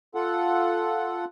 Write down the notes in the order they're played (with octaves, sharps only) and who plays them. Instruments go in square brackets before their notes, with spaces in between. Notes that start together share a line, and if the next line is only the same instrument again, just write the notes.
[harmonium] F4 A4 F#5